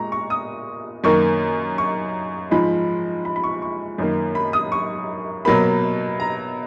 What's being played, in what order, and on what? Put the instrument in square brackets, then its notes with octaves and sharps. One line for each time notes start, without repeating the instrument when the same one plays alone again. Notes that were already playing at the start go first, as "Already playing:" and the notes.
Already playing: [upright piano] A#2 G#3 A#5 C#6
C#6
D#6
F#2 D#3 A#3 C#6
C#6
G#2 F3 G#3 B5
B5
B5
C#6
C#6
F#2 D#3 A#3
B5
D#6
C#6
B2 F#3 A#3 B5
A#5